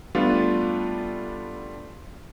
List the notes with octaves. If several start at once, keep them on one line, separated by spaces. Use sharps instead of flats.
G3 A3 B3 D4 F4